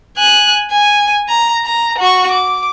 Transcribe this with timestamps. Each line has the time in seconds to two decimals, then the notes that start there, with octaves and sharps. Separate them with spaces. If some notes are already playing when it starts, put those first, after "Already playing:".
0.17 G#5 F#6
0.71 G#5
1.29 A#5
1.65 A#5
1.99 F#4 C#6
2.31 D6